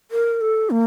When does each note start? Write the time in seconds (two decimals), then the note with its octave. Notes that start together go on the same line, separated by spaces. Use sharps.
0.11 A#4
0.41 A4
0.70 A#3